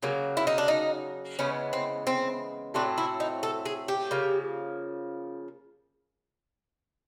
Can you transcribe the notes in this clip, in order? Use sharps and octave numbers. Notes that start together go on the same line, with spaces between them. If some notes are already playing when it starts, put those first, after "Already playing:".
C#3 F#3 A#3
E4
D#4
D4
D#4
C#3 E3 G#3 B3 C#4
C4
C4
A2 F#3 A3 C4 D4
E4
D#4
A4
G#4
G4
C#3 F3 A#3